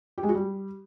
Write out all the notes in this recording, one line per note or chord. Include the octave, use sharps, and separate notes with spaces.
G4
G#3
F#4
G3